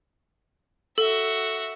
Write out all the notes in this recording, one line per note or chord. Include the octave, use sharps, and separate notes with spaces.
F#4 A4 E5